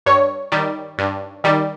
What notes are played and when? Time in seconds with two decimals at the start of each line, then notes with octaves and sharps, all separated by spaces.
0.06 G2 C#5
0.52 D#3 G3
0.98 G2
1.44 D#3 G3